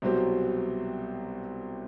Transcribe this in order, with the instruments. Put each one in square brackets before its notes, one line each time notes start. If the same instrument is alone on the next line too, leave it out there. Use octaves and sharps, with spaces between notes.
[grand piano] C2 B2 F#3 C4 G4